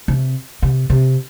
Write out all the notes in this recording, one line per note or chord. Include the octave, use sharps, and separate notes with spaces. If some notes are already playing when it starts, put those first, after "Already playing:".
C3
C3
C3